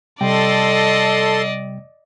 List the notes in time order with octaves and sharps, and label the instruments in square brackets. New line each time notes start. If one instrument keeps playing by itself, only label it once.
[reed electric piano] C3 G3 G5 [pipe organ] A4 C6 [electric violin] D5 D#5